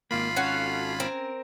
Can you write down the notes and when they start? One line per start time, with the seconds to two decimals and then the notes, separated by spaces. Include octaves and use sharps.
0.11 G#1 A#3 F4 B5 C7
0.36 C#4 F#4 A4 F5
1.00 C4 A#4